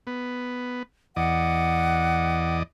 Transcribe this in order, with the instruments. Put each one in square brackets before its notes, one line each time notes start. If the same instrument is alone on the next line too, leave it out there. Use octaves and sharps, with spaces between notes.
[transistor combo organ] B3
[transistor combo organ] E2 D5 D#5 [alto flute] F#5